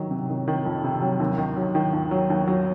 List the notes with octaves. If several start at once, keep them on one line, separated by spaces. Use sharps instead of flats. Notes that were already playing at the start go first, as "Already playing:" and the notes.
Already playing: D#3 F#3
C3
D#3
D#3
F2
C3
F#3
D#2
D#3
F#3
D#3
D#2
F#3
D#2
F#3